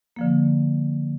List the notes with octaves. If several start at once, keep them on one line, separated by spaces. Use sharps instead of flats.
D3 F3 A#3